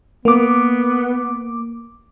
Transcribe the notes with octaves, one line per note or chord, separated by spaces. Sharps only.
A#3 B3 D6